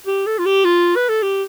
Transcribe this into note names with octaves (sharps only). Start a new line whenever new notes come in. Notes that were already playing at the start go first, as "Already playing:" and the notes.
G4
A4
F4
G4
F4
B4
A4
G4